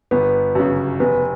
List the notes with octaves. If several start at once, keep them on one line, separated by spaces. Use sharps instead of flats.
G1 B3
F#2 C#3
F1 B3